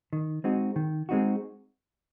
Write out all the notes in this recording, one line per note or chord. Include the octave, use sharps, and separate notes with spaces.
D#3
G#3 C4 D#4 F#4
D#3
G#3 C4 D#4 F#4